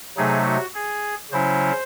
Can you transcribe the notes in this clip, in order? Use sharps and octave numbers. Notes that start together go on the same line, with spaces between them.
C3 F#3 A3 D#4 G#4
F#4
G#4
C#3 F#3 C#4 E4 C5